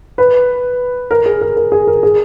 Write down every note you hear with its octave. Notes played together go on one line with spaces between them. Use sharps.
B4
A#4
G#4
A#4
A#4
G#4
A#4
G#4